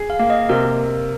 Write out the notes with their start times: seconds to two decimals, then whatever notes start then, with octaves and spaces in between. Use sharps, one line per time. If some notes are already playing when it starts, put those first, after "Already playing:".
Already playing: G#4
0.10 F5
0.19 A#3
0.30 D#5
0.49 C3 A#4